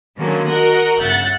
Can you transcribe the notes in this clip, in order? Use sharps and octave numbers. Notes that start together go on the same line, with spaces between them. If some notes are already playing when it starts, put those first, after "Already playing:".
D3 D#3 F#3 G#3 A#3 C#4
F#4 A#4 D#5 F#5
G1 C#3 E5 F#5 G6 A6